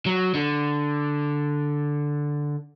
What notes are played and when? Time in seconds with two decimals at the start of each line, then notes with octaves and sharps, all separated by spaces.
0.06 F#3
0.34 D3